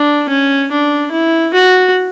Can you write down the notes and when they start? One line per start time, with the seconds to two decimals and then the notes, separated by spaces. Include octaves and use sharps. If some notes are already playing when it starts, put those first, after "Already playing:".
Already playing: D4
0.30 C#4
0.71 D4
1.12 E4
1.54 F#4